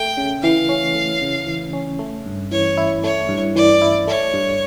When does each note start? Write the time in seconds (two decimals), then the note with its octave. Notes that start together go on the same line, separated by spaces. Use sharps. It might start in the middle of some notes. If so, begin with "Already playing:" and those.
Already playing: A3 G5
0.17 C#3
0.42 E3 F5
0.69 C#4
0.95 A3
1.22 C#3
1.47 E3
1.73 C#4
1.99 A3
2.26 G2
2.51 E3 C#5
2.78 E4
3.03 A3 C#5
3.29 G2
3.55 E3 D5
3.81 E4
4.07 A3 C#5
4.34 G2